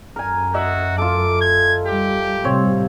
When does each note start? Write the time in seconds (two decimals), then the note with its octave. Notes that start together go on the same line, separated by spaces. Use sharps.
0.16 F#2 A#4 G#5
0.54 F#4 D#5 E5
0.98 F4 A4 D6
1.41 G#6
1.87 G3 G4
2.44 A2 C3 G3 C4 C#5